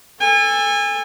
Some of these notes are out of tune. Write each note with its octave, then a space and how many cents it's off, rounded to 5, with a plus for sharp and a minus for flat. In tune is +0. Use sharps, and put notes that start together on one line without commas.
A4 +0 G#5 -30